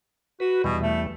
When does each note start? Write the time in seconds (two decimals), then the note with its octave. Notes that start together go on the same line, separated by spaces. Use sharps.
0.40 F#4 B4
0.64 E2 B2 E3 G3
0.82 A3